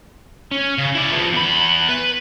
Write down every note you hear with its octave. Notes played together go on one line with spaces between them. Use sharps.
C#4
C#3
E4 D5
F3 B3
E2 B5
B4